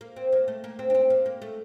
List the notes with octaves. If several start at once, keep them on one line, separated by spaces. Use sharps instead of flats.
A#3
C4
A#3
A3
A#3
C4
D4
C4
A#3
A#3
A3